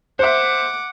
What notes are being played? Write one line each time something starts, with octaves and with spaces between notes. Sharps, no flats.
C5 E5 F#5 D6